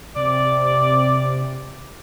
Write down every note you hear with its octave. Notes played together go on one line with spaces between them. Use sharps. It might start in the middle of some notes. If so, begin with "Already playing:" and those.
C3 D5